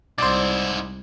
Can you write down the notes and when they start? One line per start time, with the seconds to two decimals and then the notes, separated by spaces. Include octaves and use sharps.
0.18 C2 G#2 E4 C5 D5